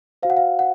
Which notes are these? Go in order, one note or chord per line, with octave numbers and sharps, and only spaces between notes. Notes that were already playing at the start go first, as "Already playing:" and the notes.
F#4 C5 F5
F#5
F5
F#5